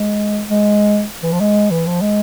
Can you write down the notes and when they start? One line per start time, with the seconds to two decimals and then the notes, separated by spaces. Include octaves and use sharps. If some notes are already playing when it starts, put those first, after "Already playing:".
Already playing: G#3
0.50 G#3
1.23 E3
1.32 F3
1.41 G#3
1.71 E3
1.86 F3
2.02 G#3